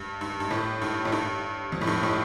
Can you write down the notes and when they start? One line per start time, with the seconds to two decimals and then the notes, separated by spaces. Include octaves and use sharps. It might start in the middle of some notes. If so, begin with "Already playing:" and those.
Already playing: G2
0.21 G2
0.40 G2
0.51 A2
0.82 G2
1.05 A2
1.12 G2
1.72 F2
1.81 A2
1.87 G2
2.03 A2